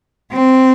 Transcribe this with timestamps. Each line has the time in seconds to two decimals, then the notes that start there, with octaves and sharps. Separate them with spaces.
0.32 C4